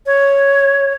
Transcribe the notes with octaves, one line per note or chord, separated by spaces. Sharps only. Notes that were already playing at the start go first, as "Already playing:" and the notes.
C#5